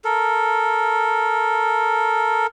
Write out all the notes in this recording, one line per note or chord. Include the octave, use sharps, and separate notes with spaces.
A4 A#4